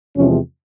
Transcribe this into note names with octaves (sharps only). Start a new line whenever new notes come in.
E2 C3 F3 G#3 C#4